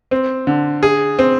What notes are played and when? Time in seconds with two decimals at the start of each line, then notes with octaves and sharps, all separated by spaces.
0.11 C4
0.47 D3
0.83 G#4
1.19 C4